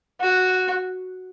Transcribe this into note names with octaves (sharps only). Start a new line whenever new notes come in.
F#4